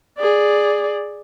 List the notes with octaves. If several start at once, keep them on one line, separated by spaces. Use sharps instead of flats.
G#4 D5